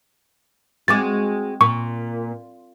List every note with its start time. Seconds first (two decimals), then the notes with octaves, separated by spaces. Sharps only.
0.88 G#3 C4 F#4 D6 A6
1.61 A#2 C#6